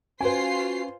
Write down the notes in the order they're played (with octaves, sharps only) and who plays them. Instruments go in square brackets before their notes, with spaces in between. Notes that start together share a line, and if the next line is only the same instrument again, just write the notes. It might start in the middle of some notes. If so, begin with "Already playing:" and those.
[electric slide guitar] C#4 G5 [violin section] F4 C5 C7 [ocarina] F#4 [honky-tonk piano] B4 G#5